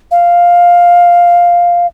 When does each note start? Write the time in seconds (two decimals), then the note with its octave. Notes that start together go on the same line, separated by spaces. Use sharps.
0.11 F5